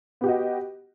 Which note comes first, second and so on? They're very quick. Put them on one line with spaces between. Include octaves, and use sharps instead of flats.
B3 G4 F#4 D#5